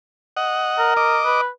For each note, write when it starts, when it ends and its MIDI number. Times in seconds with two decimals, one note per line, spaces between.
0.37 0.94 75
0.37 0.94 78
0.79 1.20 70
0.97 1.41 75
0.97 1.41 86
1.25 1.48 71